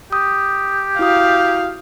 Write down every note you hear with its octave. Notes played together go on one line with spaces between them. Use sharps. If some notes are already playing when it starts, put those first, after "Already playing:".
G4 D#6
E4 F#4 F5 D#6